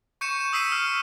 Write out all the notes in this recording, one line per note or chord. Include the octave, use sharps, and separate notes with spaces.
C#6 G6 C#7 D#7 E7
E7
D#6 E6 B6 C7 D#7
F6